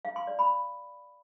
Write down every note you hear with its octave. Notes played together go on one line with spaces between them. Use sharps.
F5
C6
D5
B5